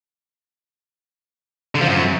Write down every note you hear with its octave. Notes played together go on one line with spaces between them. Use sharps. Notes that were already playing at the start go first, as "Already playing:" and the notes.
D3
F3
F#2